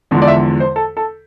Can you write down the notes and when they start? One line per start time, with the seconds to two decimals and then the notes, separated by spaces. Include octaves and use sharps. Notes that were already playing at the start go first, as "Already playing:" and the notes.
0.11 E2 D3 F3 G#3
0.22 D5
0.28 E5
0.60 C5
0.76 A4
0.97 A4